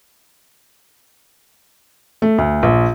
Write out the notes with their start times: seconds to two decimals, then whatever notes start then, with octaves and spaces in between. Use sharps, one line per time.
2.22 A3
2.38 D2
2.63 A#1